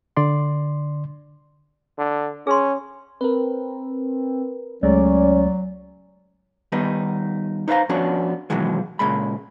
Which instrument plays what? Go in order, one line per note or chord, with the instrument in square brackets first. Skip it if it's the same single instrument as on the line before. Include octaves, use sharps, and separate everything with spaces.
[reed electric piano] D3 D5 C6
[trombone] D3
[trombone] C#4 [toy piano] G#4 C6
[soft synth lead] C4 [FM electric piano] A#4 B4
[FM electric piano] C#2 G#3 A3 [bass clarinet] F#3 [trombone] C#4 [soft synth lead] D5
[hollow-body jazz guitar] D#3 G3 B3 D#4
D#4 B4 C5 F5 A#5
F3 B3 C#4 D4 F#4 C#5
B2 D#3 E3 F#3 G#3
A#2 C#3 G#3 B5